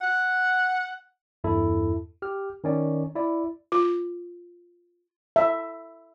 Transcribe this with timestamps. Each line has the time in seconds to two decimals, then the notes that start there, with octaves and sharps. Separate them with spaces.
0.01 F#5
1.44 E2 G2 E4 A4
2.22 G4 F6
2.64 D#3 C#4 D5
3.15 E4 D5
3.72 F4
5.36 E5